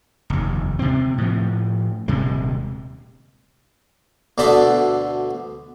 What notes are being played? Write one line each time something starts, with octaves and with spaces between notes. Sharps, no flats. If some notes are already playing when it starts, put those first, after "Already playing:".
F1 D#2
C3 C4
A2 F3
D#1 C3 G#3
D2 B2 D3 C5 D5 E5